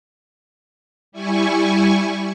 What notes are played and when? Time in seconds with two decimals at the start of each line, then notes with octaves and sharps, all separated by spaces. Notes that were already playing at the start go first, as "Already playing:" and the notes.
1.12 G3 E4 G#5 C#6